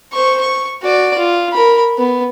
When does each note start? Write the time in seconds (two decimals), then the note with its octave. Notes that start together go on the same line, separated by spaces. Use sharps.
0.13 C5 C#6
0.41 C#6
0.82 F#4 D5
1.18 F4
1.52 A#4 B5
1.98 B3